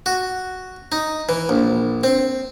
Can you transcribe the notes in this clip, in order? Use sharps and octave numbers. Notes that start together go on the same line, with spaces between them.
F#4
D#4
E3
A#1
C4